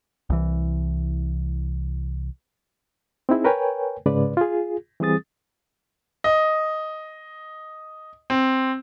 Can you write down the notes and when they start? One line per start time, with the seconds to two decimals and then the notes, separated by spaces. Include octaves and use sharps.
0.30 C2 E3
3.29 C4 D#4 E4 G#4
3.44 A#4 B4 C#5 G5 G#5
4.06 G#2 C#3 G#3 B4 D5
4.37 F4 G#4
5.00 E3 G3 C4 G#4 D#6 A6
6.24 D#5
8.30 C4